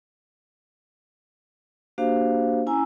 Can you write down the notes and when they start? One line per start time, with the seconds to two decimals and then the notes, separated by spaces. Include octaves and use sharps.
1.98 A#3 D4 F#4 G4 C5 F5
2.67 C#4 E4 G#5 A#5 E6